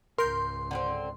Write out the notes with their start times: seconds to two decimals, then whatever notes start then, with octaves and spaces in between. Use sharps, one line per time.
0.18 C#2 G#2 A#4 C6 G6
0.71 D3 B3 C4